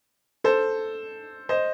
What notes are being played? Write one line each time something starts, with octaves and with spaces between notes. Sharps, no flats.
A4 C5
C5 D#5